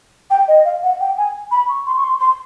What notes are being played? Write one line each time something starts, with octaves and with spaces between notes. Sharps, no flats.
G5
D#5
F5
F#5
G5
G#5
B5
C#6
C6
C#6
C6
C6